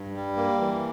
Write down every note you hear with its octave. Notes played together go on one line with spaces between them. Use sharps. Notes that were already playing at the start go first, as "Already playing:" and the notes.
Already playing: G2
G3
A#3
E3